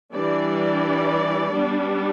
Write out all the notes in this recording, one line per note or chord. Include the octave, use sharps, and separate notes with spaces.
E3 G3 D4 D5
G3 B3 D4